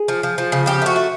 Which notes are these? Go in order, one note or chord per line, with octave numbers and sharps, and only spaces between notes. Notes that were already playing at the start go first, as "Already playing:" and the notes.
Already playing: G#4
F3
F3
F3
C#3
F3 G4
A3 F#4
A3